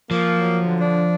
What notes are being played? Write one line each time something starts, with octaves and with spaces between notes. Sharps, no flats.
F3 A#3
F#3
D3
D4